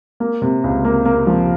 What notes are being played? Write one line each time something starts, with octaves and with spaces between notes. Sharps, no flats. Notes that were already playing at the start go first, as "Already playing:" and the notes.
A#3
C3
C#2
A#3
A#3
F3